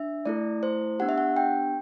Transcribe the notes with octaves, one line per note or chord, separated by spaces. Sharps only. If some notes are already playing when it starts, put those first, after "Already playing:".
Already playing: D4 E5
A3 E4 A4 D5
C5
B3 D4 G4 F#5
E5
F#5
G5